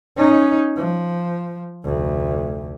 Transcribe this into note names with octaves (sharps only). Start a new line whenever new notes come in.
C#4 D#4
F3
F1 D2